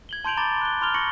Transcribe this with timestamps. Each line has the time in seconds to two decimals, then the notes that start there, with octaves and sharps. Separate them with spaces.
0.09 G#6 F#7 G7
0.24 A5 C6 G6 D7 F7 F#7
0.37 A#5 B5 D6 A6 F#7 G7
0.61 F#6 G7
0.81 B5 C6 F6 F7 G7
0.94 C#6 A#6 C#7 F#7 G7